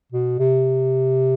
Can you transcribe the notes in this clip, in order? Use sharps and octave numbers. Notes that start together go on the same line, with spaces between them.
B2
C3